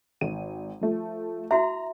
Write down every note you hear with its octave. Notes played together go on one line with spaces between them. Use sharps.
G#1 D#7
F3 A3
E4 F#4 E5 A#5